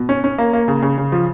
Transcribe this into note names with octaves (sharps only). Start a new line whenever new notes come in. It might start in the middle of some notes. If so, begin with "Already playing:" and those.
Already playing: B2
C#4
C#4
A#3
A#3
C#3
C#3
C#3
F3